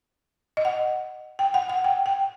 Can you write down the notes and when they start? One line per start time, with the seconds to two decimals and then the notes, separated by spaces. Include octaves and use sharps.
0.57 D#5
0.65 F#5
1.39 G5
1.54 F#5
1.69 F#5
1.84 G5
2.06 G5